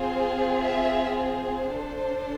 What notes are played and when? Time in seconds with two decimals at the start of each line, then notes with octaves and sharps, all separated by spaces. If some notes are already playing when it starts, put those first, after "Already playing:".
Already playing: C4 F4 G#4 C5
0.63 E5
1.17 C5
1.72 D4 A4